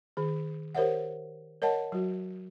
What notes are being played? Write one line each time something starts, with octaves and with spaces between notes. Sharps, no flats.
D#3 G#4
G4 A#4 C5 C#5 E5 F#5
A#4 C#5 D#5 F#5 A5
F#3 F#4